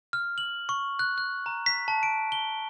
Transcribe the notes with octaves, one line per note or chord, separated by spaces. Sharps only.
F6
F#7
C#6
F#6
F#6
A#5
B6
A5
D7
G7